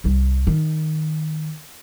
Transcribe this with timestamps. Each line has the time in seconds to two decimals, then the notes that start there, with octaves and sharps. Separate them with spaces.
0.04 C2 G3
0.47 D#3